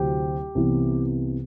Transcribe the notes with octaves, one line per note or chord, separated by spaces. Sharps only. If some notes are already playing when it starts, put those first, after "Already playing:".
Already playing: D2 C3 F#3 C4 E4 G4
C2 C3 E3 B3